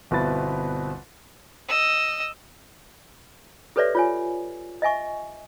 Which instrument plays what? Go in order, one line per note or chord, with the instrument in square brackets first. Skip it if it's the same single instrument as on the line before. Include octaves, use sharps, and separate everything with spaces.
[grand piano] G1 B2 C4 E4 B4 A6
[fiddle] D#5 E6
[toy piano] G4 A4 B4 C#5 D5 E5
F4 C#5 G#5
D#5 E5 G#5 C#6